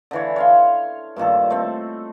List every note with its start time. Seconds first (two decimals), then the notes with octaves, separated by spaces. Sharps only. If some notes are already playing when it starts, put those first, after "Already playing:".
0.11 D3 E3 C#5
0.36 C#5 F5 C6
1.16 G2 A#2 D#3 A4
1.50 A3 C4